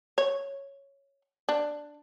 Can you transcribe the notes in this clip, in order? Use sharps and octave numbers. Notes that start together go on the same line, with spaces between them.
C#5
D4